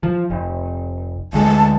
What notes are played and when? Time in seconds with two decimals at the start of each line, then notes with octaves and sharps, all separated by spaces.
0.03 F3
0.30 F1
1.33 D2 G#3 A5